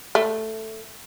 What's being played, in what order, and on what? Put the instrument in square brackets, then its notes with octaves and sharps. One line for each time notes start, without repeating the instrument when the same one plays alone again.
[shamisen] A3